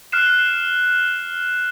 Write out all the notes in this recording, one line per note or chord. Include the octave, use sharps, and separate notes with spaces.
F6 F#6 C7 E7